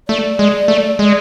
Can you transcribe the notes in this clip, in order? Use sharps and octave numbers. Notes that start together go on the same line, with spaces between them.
A3 D5
G#3
A3
G#3